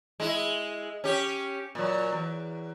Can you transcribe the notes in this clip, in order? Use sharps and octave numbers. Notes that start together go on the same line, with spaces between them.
G#3 E4
C#4 G4
A#2 F#3
E2